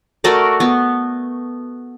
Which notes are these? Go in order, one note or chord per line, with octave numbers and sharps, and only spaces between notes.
A3 F#4 A#4 D5
B3